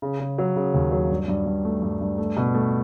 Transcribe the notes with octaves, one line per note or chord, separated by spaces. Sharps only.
C#3
C#3
F#3
C#3
D#2
F#3
G2
G2
G2
A3
G2
G2
A3
B2
A3